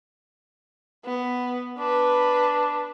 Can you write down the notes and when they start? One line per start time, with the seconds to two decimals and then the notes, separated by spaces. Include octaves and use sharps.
1.05 B3
1.78 D4 B4